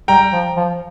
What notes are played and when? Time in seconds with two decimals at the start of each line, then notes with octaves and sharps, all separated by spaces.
0.08 G3 G5 A#5
0.33 F3
0.57 F3